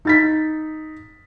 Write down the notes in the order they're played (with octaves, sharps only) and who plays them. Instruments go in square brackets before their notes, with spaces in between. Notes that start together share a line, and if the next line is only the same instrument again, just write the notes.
[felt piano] D#4 A6 B6